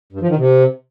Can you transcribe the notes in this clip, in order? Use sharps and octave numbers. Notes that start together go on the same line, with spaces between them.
G2
F3
D#3
C3